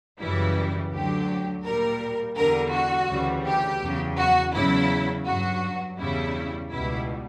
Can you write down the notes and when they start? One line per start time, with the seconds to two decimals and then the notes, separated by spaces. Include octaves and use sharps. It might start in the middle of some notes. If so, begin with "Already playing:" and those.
0.20 F#2 C#3 E3 G3 E4
0.92 D2 D3 F#3 G4
1.65 A#2 G3 A#4
2.37 E2 D3 G3 A#4
2.73 F#4
3.09 D2 C#3 E3 G3
3.46 G4
3.82 E2 C#3 F#3
4.18 F#4
4.53 E2 C#3 F#3 E4
5.26 G2 F#3 F#4
5.99 E2 C#3 G3 E4
6.71 C#2 B2 G3 E4